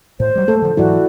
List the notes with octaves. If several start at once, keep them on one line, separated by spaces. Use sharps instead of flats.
A2 C5
F#3 G3
A3 A#3 A4
D3 F3
G#2 E3 F#3 E4 F#4 D5